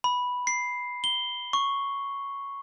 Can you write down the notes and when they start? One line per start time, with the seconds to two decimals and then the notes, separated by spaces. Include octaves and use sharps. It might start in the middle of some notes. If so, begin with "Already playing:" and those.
0.04 B5
0.47 C7
1.04 G7
1.53 C#6